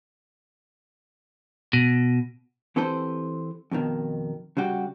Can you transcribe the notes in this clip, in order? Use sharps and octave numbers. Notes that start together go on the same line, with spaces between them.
B2
E3 C4 G4 A4 B4 C5
F2 B2 D#3
C#3 G3 F#4 G4